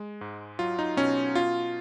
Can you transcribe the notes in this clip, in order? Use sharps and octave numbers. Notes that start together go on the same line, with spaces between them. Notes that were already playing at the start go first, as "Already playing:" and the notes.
Already playing: G#3
G#2
F#3 F4
D#4
B2 C#4
B2 F4